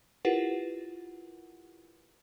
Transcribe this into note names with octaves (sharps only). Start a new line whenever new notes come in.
E4 F4 G4 A#4 B4 F#5